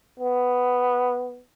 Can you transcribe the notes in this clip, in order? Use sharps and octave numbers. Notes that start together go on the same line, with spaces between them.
B3